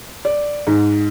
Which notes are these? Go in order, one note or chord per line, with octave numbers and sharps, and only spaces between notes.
D5
G#2